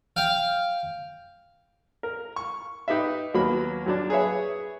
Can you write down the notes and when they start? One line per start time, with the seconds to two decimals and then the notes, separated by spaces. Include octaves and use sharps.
0.16 F5 G5
2.03 A#4
2.36 C#6
2.88 D#4 G4 B4 E5
3.34 D#2 F#3 A#3 B3 B5
3.86 F#2 F#3 D4
4.10 G#4 B4 C#5 E5